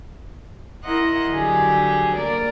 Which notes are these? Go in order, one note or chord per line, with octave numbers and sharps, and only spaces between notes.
E4 A#4 D#5 F#5 C6
D3 F#3 G4 G#4
A#3 A#4 D5